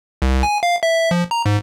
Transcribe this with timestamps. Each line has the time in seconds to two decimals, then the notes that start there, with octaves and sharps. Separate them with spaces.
0.22 C2
0.43 G#5
0.63 F5
0.83 E5
1.11 F3
1.31 A#5
1.46 G#2